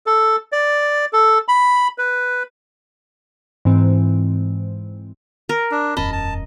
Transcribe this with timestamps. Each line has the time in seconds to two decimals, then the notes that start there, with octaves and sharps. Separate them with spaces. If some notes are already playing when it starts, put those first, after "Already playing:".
0.06 A4
0.52 D5
1.13 A4
1.48 B5
1.98 B4
3.65 G#2 E3 C4
5.49 A#4
5.71 D4
5.97 E1 F#2 C#4 D#5 A5 B5
6.13 A5